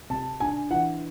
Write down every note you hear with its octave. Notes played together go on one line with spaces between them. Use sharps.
C3 A5
D4 G#5
E3 F#5